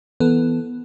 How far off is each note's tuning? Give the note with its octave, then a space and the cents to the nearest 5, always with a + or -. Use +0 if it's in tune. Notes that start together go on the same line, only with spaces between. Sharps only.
E3 +0 B3 +0 A4 +0